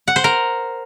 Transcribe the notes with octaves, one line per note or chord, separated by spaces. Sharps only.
F#5
C5
A#4